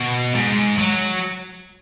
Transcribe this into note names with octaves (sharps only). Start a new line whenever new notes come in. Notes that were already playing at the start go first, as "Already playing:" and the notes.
Already playing: B2
G#2
F#3